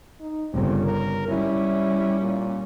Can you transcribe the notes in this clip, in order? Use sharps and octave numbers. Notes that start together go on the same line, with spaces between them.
D#4
G1 C#3 C4
A#4
G3 C#4 E4
A#2